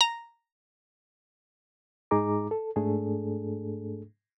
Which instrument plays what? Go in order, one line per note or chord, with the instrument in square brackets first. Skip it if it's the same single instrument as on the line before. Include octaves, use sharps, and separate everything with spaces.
[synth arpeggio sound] A#5
[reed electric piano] G#2 G#3 D#4 G#4 A#5 D6
A4
G#2 A3 D4 G#4 A4